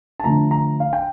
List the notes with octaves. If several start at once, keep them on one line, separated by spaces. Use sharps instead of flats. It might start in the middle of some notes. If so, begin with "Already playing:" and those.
A5
D3 F3 A3 A#5
A#5
F5
G5